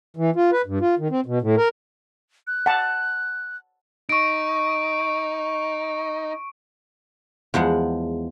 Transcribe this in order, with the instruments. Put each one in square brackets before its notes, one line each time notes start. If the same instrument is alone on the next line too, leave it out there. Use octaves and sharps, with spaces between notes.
[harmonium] E3
F4
B4
G2
F4
D#3
C4
B2
A2
A#4
[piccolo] F#6
[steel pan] F#5 A5
[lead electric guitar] D#4 [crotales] C#6 D7
[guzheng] E2 F3 G#3 F#5